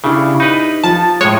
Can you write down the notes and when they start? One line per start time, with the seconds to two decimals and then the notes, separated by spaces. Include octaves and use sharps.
0.04 C#3 D4 E4 G4
0.40 D#4 B4
0.84 F3 A5
1.21 A2 G#3 C#5